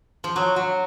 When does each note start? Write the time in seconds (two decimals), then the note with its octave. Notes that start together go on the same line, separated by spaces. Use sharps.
0.24 F3
0.36 F#3
0.56 F#3